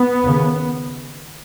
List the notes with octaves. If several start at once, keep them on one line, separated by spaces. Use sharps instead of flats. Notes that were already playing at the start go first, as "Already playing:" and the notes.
Already playing: B3
D#2 C#3